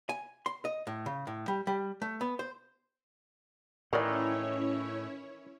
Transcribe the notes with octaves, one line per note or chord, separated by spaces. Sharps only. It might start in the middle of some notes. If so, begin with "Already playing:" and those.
G#5
C6
D#5
A2
C#3
A2
G3
G3
A3
B3
C5
A2 D#3 E3 C#4 E4 A#4 C#5 D5